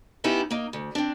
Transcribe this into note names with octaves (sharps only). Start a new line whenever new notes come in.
B3 C#4 D#4 E4 G4
A#3 D#4
D2
C4 D4